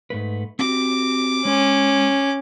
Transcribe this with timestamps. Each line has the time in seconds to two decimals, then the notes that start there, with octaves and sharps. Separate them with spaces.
0.10 G#2 A3 B4
0.59 C4 F#4 G4 D6
1.45 G#3 C#4